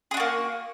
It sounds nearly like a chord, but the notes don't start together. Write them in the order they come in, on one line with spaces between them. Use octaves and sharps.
G#4 D4 F#4 A#3